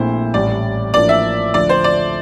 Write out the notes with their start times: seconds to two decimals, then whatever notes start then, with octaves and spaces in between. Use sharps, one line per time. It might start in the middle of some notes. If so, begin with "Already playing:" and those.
Already playing: A#1 A#2 A3 C4 E4 C5
0.34 A1 A2 G3 D5
0.94 A1 A2 F3 A#3 D4 D5
1.09 E5
1.54 D2 D3 F3 A3 D4 D5
1.69 C5
1.84 D5